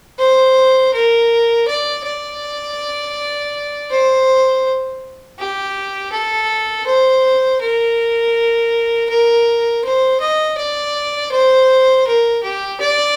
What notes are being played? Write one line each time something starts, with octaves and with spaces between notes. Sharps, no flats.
C5
A#4
D5
D5
C5
G4
A4
C5
A#4
A#4
C5
D#5
D5
C5
A#4
G4
D5